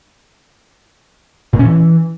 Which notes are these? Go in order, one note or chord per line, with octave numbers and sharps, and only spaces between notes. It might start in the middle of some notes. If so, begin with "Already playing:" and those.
A#2
C#4
E3